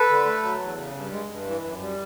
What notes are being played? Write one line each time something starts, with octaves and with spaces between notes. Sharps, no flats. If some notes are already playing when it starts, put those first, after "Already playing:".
Already playing: A4 B4
D3
A3
F#3
E2
C#3
G2
G#3
G2
E3
F#2
G3